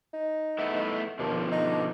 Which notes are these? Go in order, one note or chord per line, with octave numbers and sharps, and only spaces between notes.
D#4
A3 B3 E4
D#2 B2 D3 F3
D#4